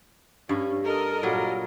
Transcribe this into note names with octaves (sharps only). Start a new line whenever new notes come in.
G2 C#4
A4 A#4 D#5
A#2 F#3 G3